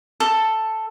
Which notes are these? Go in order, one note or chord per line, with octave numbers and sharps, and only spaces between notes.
A4